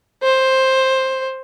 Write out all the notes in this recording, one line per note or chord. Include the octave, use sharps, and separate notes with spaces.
C5